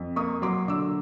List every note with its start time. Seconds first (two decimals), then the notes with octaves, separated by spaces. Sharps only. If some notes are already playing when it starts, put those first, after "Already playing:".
Already playing: F2
0.16 A#3 C#6 D#6
0.42 F#3 C6 D6
0.68 D3 D6 E6